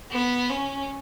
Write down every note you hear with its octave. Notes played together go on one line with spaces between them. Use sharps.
B3
C#4